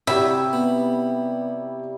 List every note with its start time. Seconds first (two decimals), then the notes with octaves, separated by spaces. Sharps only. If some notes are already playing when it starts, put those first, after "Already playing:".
0.07 C3 G3 E4 C#5 E5 G5 B5
0.53 B3